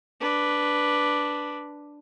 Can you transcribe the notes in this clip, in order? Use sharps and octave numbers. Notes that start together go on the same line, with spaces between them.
D4 B4